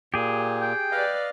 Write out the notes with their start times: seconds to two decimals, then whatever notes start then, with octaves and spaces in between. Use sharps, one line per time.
0.14 A#2 G4 G#4
0.61 G5
0.92 B4 D5 D#5 F5